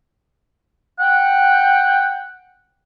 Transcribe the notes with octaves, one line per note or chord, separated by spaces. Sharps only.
F#5 G5